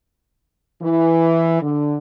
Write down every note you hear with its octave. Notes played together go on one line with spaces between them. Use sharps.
E3
D3